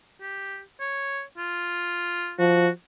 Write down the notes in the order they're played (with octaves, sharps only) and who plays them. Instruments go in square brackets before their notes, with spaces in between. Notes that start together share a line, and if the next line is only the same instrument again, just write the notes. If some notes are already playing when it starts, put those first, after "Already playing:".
[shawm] G4
C#5
F4
[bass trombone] F3 [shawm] F#4